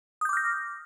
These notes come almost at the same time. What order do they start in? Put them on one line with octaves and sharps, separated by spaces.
D#6 G6 D6 F6 A#6